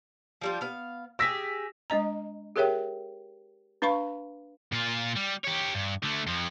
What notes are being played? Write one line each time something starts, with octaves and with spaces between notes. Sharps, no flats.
F3 G3 F4
B3 F5
G4 G#4 E6 A#6 B6
G#3 D4 D#5 A#5
G4 G#4 A#4 C#5 E5 G5
D4 B4 F5 B5 C#6
A#2 F4
G3
G4 C#5
G2
D3 A3
F2 F3